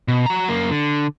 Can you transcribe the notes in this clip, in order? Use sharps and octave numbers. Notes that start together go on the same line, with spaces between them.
B2
F#4 A#5
F#2 A#3
D3